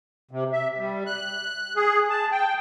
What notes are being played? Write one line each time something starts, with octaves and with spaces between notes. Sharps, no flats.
C3
E5
G3
F#6
G#4
A5
G5